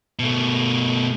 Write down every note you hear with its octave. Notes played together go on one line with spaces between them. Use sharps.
B2 A3